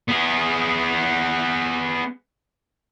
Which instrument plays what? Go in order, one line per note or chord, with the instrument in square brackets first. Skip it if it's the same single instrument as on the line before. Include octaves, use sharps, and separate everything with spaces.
[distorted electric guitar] B3 G#4